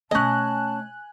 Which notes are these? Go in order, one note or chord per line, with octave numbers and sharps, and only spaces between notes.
B2 A3 C#4 D#5 G#5 A5 F#6